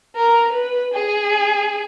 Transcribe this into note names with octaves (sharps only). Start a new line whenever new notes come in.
A#4
B4
G#4